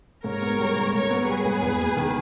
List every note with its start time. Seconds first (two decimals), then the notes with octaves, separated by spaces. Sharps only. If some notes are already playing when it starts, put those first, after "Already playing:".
0.24 G#2 A#4 C#5
0.42 B3
0.59 G3
0.76 G#2
0.93 G#2 A#4 C#5
1.11 B3
1.27 G3 G#4 B4
1.45 G#2
1.62 E2
1.78 A#3
1.97 D#3